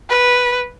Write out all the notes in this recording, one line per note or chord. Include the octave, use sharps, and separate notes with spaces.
B4